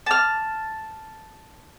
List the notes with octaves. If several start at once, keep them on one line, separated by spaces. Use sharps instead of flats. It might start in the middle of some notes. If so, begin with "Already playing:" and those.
A5 F6